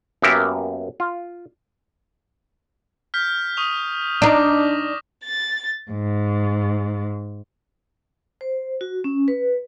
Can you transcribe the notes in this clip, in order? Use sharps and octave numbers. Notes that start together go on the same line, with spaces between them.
F#2 A#3 B3 G4 A#4 E5
F4
F6 G6 B6
C#6 D#6 F7
D4 D#4 D6 A#6
A6
G#2
C5
F#4
C#4
B4